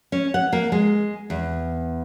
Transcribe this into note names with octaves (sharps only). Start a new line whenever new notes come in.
C#4
F#5
A#3
G#3
E2